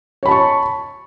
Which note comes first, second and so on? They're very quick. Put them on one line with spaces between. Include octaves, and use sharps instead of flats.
C#5 B5 A5 C#6